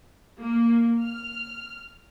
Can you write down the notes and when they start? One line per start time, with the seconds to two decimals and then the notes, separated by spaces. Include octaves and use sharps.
0.41 A#3
1.02 F6